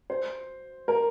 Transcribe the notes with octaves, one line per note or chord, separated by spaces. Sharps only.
C5
A#4